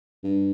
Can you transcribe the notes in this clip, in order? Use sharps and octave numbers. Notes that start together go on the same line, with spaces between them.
G2